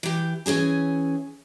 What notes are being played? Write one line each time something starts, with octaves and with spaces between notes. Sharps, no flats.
E3 G4
E3 C#4 G#4 G#5